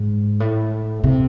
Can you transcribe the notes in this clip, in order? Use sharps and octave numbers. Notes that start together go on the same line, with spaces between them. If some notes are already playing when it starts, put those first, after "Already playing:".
Already playing: G#2
A2
C3